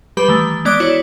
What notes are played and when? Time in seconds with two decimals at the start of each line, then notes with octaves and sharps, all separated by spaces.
0.17 G3 G4 B4 B5
0.28 D#3 E3 A3
0.65 G#3 B3 D5 D6 F#6 D7
0.80 E4 F#4 C#5 D5